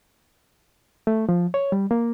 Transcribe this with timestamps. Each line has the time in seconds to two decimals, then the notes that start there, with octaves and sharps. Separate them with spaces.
1.07 A3
1.29 F3
1.54 C#5
1.72 G3
1.91 A#3